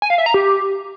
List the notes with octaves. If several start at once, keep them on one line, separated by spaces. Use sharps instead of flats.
G#5
F5
E5
A#5
G4